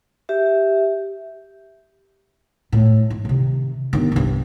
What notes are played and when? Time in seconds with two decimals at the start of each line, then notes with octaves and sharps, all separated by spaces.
0.29 G4 E5
2.72 A2
3.10 G#2
3.25 C3 D#3
3.93 G1 D#3
4.12 C2 G2